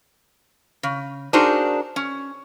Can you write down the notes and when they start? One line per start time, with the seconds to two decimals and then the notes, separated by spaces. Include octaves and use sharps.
0.83 C#3
1.33 D4 D#4 F#4 G#4 A#4 C5
1.96 C#4